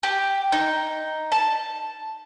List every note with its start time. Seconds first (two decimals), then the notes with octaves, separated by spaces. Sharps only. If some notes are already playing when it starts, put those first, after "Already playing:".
0.03 G4
0.52 D#4
1.32 A5